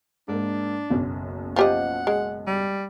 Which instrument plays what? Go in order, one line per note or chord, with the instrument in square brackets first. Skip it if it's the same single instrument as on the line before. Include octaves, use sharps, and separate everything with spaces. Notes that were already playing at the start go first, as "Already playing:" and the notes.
[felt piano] G#2 A#3 [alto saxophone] D4
[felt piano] F#1 B1 F#2
[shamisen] F3 G4 D#5 [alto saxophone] F#5
[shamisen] G#3
[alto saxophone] G3